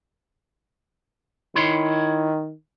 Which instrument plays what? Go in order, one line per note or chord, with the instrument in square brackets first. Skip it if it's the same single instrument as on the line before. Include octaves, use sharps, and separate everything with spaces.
[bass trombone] D#3 [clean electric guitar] E4 C#5 C6